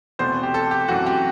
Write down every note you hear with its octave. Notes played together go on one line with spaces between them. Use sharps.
E2 B2 A3 C4 C5
G4
A4
G4
F#2 E3 A3 C4 F#4
G4